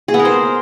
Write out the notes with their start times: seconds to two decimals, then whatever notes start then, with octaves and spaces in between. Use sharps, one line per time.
0.08 G#4
0.14 B3
0.19 A#4
0.25 C5